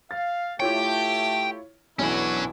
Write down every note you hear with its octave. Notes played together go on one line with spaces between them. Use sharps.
F5 A6
A3 E4 F4 G4 C#5 G5
B1 E3 B3 C#4 D4 E4 F#4 G#5